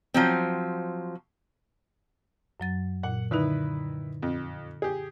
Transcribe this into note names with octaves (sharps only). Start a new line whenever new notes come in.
F3 F#3 C4
F#2 F#3 A6
A#2 F#5
D3 D#3 D#4 E4 B4
F2
G4 G#4